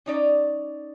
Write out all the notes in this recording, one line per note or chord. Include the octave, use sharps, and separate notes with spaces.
C#4 D#4 D5